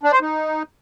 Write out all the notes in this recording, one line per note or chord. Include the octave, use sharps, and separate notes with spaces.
D4
C5
D#4